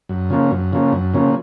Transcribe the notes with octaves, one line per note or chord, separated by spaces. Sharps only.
F#2
C#3 F3 A#3 C#4
F#2
C#3 F3 A#3 C#4
F#2
C#3 F3 A#3 C#4